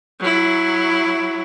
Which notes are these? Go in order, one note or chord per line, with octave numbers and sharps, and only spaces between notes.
F#3 E4